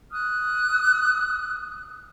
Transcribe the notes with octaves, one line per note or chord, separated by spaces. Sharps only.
D#6 F6 F#6